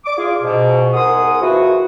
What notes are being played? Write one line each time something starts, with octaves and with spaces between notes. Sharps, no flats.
D6
F4 G#4
G#2 B2
C2 G#4 A#4 F#5 C6 D#6
B2 D#3 F3 E4 F#4